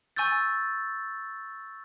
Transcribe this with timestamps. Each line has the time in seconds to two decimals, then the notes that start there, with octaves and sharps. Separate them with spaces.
0.16 G#5 C#6 E6 G6 A6